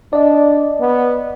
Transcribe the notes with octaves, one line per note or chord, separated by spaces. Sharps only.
D4 D5 D#5
B3